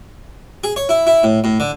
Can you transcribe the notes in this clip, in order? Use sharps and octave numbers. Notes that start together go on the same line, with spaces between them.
G#4
C#5
E4
E4
A2
A2
D3